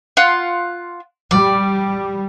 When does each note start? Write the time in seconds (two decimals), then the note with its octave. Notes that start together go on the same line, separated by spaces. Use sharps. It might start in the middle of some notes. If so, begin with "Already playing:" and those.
0.17 F4 F#5
1.31 G3 D5